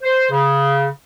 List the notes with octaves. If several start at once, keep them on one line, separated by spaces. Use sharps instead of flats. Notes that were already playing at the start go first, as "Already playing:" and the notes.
C5
C#3